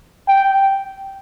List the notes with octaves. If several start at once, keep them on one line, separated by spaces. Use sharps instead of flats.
G5